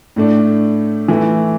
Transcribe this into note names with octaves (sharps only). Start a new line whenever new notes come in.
A2 A3 D4
E3 A3 E4